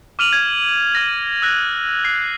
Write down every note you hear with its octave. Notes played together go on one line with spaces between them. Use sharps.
D6 F6 D#7 F7 F#7
G#6
F6 A#6
E6 F#6 A#6
F#6 C7